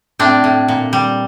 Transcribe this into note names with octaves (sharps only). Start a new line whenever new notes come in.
A2 C4 D4
A2
A#2
G3